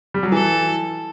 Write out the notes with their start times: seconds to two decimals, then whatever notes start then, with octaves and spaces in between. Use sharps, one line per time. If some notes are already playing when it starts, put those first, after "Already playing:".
0.14 G3
0.23 F#3
0.32 E3 A4